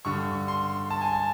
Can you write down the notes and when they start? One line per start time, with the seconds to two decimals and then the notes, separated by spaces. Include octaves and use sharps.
0.05 G2 D3 C#6
0.48 C6
0.91 A5
1.01 G#5
1.13 A5